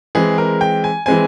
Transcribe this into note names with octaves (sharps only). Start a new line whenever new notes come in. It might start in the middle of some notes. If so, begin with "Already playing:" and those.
E3 G#3 C4 G#4
A#4
G5
G#5
E3 G#3 C4 G#5